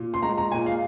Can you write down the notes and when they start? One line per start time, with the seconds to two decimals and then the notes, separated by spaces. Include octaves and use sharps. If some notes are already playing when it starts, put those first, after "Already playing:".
Already playing: A#2
0.14 C6
0.23 G#3 A#5
0.38 A#5
0.52 A#2 G#5
0.66 F5